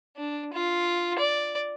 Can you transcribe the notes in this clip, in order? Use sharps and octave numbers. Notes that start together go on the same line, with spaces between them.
D4
F4
D5